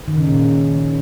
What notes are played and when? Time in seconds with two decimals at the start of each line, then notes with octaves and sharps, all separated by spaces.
0.08 D#3
0.17 C#3
0.27 A#2